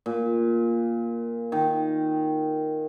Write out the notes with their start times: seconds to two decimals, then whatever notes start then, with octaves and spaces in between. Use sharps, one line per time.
0.06 A#2
1.52 D#3